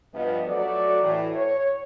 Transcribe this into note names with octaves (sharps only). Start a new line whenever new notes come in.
G2 F3 G3 B3 D#5
F#3 A3 F#4 A4 D5
A2 E3
C#5